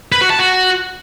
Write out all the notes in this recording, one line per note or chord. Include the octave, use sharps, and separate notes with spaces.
B4
F#4
A5
F#4